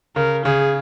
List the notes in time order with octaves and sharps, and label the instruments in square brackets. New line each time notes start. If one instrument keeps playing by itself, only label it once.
[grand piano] C#3 [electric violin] A#4
[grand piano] C#3 [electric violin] G#4